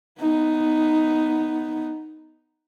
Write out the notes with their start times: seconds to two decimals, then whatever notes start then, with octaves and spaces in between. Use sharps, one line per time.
0.20 B3 D#4